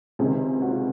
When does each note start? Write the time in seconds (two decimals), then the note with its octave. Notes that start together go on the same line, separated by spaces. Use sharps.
0.19 C#2 C3 D#3 G#4
0.62 F#4
0.70 F4